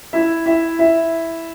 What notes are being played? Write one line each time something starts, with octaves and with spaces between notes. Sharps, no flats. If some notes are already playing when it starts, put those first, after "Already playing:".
E4 E5
E4 E5
E4 E5